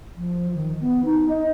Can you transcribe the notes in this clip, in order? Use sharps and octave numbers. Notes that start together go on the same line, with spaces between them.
F3
D#3
B3
D#4
D#5